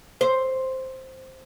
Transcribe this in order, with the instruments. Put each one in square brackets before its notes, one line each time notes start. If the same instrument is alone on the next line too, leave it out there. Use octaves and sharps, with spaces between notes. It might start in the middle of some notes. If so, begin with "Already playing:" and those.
[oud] C5